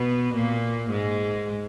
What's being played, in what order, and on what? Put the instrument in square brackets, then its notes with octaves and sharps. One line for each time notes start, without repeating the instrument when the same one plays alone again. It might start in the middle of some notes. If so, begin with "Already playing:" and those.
Already playing: [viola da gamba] B2 B3
A#2 A#3
G#2 G#3